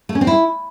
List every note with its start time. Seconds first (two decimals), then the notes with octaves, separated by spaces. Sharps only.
0.09 A3
0.15 C#4
0.21 C4
0.27 E4